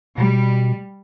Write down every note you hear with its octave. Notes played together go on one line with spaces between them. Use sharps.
B2 G3